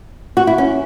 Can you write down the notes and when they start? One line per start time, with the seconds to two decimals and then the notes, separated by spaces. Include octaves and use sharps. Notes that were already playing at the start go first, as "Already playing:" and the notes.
0.37 F#4
0.47 E4
0.58 C#4